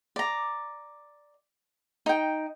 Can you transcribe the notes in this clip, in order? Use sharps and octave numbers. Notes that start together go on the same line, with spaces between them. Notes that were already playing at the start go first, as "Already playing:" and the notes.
D5 A#5
D#4 G5